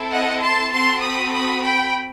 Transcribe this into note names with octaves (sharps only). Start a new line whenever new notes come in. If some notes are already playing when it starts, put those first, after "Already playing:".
Already playing: C4 E4 A4
D#5 F#5
A5 C6
C4 F#4 A4 A5 C6
B5 D#6
B5 D#6
G5 B5